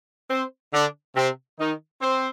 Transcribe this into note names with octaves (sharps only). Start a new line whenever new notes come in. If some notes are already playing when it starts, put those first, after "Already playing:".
C4 C5
D3 D4
C3 C4
D#3 D#4
C4 C5